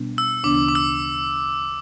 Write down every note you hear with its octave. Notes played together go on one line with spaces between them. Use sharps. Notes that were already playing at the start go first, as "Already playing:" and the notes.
Already playing: B2 G3 B3 D4
E6
D2 C#3 E3 B3 D4 D6
D6
E6